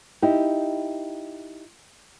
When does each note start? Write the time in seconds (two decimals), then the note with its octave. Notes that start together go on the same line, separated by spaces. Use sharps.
0.22 D#4 E4 G4